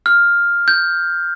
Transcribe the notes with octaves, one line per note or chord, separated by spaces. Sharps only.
F6
G6